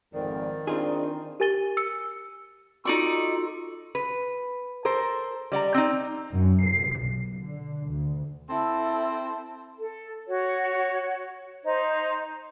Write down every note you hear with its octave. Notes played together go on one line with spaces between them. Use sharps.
G#1 F2 D#3 D5
C4 D4 D#4 F4 G#4
G4 A#4 G#5 A6 D#7 G7
E6 C#7
D#4 F4 F#4 A4 D5 C#6
B4
A4 A#4 C5
G3 D5 F#5 A#5
C4 D#4
F#2
C7
B1
D3
D2
C4 E4 A4
A4
F#4 C#5
D#4 C5